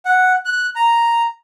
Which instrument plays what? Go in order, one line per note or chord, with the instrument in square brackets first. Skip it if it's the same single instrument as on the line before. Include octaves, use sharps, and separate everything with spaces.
[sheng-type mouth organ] F#5
F#6
A#5